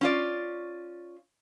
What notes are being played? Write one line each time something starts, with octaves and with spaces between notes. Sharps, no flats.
C#4 F4 D5